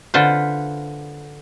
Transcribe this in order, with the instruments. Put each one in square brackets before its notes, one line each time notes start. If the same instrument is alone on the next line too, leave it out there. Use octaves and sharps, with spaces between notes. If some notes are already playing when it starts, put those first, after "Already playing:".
[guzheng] D3 F4 B4 C5